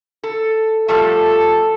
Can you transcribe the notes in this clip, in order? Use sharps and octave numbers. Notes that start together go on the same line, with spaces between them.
A4
F3 G3 A3 A4